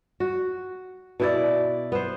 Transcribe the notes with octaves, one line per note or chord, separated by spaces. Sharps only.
F#4
B2 E4 D5
B3 C5